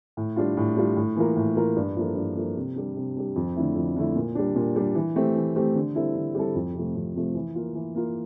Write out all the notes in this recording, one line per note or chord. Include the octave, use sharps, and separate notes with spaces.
A2
G3 D4 F4
A2
G3 D4 F4
A2
E3 A#3 F4 A#4
A2
E3 A#3 F4 A#4
G2
F3 A#3 E4 A4
G2
F3 A#3 E4 A4
C3
G3 D4
C3
G3 D4
F2
D3 A3 E4
F2
D3 A3 E4
A#2
G3 D4
A#2
G3 D4
E3
A3 C4 G4
E3
A3 C4 G4
D3
G3 C4 E4 A4
D3
G3 C4 E4 A4
F2
C3 F3 A3
F2
C3 F3 A3
E3
A#3 F4
E3
A#3 F4